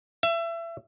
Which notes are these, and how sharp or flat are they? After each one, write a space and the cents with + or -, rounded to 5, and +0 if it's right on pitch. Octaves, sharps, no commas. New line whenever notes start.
E5 +30